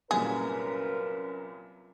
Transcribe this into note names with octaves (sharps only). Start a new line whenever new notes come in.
C2 F#2 A#2 C#4 G#4 A#4 B4